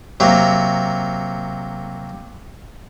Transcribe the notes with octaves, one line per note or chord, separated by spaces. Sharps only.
C3 F#3 A#3